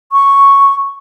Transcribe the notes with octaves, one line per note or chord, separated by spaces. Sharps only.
C#6